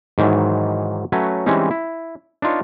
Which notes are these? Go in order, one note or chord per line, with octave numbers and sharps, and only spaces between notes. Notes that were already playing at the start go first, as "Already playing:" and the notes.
G#2 D#3 E3 F#3
F#3 A3 C#4 B4 C#5
E3 G3 G#3 C4 C#4 D#4
E4
D4 D#4 F4 B4 C#5